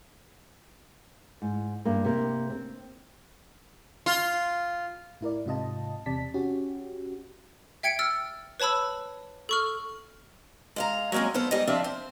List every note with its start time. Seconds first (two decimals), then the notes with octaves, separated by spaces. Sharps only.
1.42 G#2
1.85 G2 A#3
2.05 C3 A#3
2.50 C4
4.06 F4
5.21 A2 E4 A#4 D5
5.46 G#2 C3 F4 D#5 A5
6.06 E2 C3 D5 A5 B6
6.34 C#4 F#4 G4
7.83 E5 G5 G#6 C#7 D7
7.99 E6 F6 A6
8.60 B4 C#5 A5 B5 E6
9.49 A4 C#6 F6
10.76 G#3 F5 A#5
11.12 F#3 G#3 A#3 C4 C#4
11.34 B3 F4 A4 C5
11.51 G#2 G3 G4 D#5
11.68 F3 C4 D4 E5 F5
11.84 C5